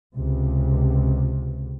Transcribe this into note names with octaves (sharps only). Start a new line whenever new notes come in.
C#2 C3